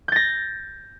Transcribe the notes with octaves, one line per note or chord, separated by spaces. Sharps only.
G6 A6 A#6